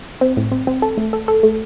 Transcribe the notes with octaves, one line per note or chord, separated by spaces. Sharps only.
C4
A2
C4
C4
A4
A3
A4
A4
A3